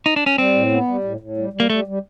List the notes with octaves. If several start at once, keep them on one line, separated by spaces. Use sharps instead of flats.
D#4
D4
C#4
G3 C4
A2
B3
G3
A2
A2
G3
G3
A#3
G3 A3
G3